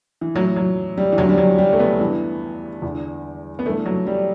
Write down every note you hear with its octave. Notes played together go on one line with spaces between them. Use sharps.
E3
A2 E3 F#3
F#3
G3
E3
E2 D3 F#3
G3
F#3
G3
A3
B3
G2 E3
E2
D3
B3
G2 E3 A3
F#3
G3